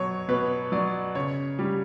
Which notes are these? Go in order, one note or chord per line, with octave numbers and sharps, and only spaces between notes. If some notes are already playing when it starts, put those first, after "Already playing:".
Already playing: B2 F#3 C#5
B2 B4
F#3 D5
C#3 C#5
G3